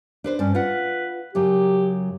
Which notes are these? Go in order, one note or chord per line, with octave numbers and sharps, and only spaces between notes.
D4 B4 C5
G2 C#4 D5
F4 B4 F#5
F#2 C#3 F#3 G4